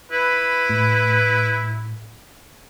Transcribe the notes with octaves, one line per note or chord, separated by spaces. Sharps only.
E4 B4
A2